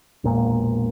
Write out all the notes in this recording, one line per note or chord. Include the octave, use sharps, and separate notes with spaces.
E1 A#1 A#2